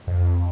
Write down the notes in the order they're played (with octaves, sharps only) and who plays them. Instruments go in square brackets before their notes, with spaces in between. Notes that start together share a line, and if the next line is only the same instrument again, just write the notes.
[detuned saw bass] F2